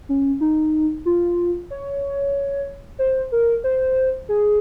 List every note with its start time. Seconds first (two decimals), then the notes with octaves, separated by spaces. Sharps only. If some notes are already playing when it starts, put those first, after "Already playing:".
0.09 C#4
0.41 D#4
1.06 F4
1.71 C#5
2.99 C5
3.32 A#4
3.64 C5
4.29 G#4